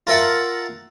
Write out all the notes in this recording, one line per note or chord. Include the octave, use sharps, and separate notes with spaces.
F4 A#4 E5 F#5 A5